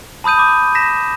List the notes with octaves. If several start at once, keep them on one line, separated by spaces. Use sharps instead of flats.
A5 B5 D#6 G6 D#7
D6
A#6 B6 E7